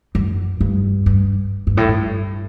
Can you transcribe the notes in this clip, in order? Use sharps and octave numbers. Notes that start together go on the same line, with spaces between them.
F#2
G2
G2
G2
A2
G2